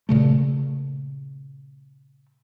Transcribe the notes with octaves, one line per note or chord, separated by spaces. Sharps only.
A#2 C#3 A3